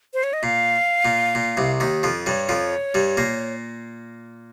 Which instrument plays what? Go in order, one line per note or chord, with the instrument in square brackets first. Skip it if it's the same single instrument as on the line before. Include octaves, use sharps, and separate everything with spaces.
[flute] C5
C#5
D#5
[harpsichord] A#2 [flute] F5
[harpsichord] A#2
A#2
C2 C3
D#2 D#3
F2 F3
[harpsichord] G2 G3 [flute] C#5
[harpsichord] F2 F3
G2 G3
A#2 A#3